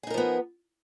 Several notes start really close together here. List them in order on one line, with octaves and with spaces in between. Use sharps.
G#4 D#4 A#4 F3 B3